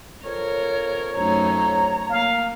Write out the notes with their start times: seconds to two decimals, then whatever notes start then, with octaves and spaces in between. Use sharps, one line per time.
0.24 F2 A#4 C#5
1.16 F#2 A3 D#4 A#5
2.11 A#3 F5